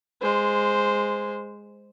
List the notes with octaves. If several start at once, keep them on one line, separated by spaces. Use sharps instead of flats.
G#3 C5